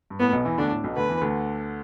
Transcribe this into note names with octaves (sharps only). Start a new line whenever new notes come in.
G2
A2 B3
B1 B2
E2 E3
D2 D3 D4
A2
B1 B2
D2 D3 B4
E2 E3
D2 D3